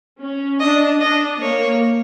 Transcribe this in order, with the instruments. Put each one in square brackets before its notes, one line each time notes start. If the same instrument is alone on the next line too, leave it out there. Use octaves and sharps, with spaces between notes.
[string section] C#4
[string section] D4 [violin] D#5
[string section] D4 [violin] D#5
[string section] A#3 [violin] C#5